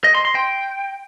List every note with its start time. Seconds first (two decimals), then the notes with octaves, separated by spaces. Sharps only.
0.04 D#5
0.15 C6
0.25 C6
0.35 G5